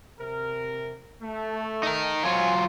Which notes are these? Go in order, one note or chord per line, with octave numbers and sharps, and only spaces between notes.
C3 A#4
A3
D#4 A#4
F#3 F4 C5 F5 G#5